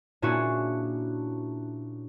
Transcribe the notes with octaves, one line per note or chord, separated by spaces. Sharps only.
A#2 C#4 D4 E4 F#4 G#4